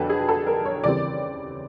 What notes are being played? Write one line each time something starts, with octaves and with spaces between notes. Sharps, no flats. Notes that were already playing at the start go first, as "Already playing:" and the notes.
Already playing: F2 D3 F#3 B3 D4 A4 B4
G#4
A4
A#4
C#5
D#2 C#3 E3 G3 C4 D5